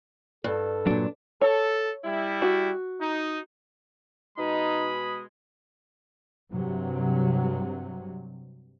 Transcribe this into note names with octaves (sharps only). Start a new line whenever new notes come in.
G2 A4
A#2 F#3 D4
A4 C#5
G3 E4
F#4
D#4
B2 G#3 D#4 B5 D#6
G2 C3 F#3